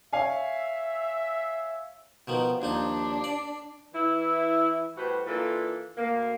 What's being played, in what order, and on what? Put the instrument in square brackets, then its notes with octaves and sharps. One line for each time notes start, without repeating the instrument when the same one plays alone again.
[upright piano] C#5 F5 G#5 [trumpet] E5
[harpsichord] B2 D#3 F3
[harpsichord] D#2 F3 D#4 [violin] D4
[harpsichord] D5
[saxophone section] E3 E4
A2 G3 F#4 B4 C5
E3 A#3 D4 F4 A4
D2 A#3